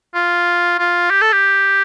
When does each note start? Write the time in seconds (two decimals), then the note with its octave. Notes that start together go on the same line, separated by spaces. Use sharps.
0.15 F4
0.79 F4
1.10 G4
1.21 A4
1.32 G4